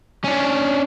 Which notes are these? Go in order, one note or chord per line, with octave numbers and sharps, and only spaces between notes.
C#4 D4